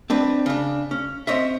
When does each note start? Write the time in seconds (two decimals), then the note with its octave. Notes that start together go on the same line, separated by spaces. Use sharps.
0.10 C4 D4 B4
0.46 C#3 D4
0.91 C#4
1.27 C4 C#5 D#5 E5